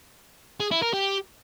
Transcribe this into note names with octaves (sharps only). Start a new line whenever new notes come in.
G#4
E4
A#4
G4